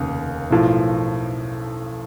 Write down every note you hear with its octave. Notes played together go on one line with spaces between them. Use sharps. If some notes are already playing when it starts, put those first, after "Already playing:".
Already playing: F1 D#2 C#3
B1 A2 F3